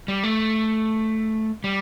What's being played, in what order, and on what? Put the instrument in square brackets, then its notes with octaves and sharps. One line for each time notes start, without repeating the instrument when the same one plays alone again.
[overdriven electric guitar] G3
A3
G3